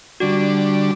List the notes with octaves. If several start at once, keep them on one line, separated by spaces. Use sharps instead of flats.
D3 G3 D4 F#4